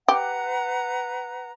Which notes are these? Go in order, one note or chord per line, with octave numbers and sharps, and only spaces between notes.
G4 B4 F#5 A#5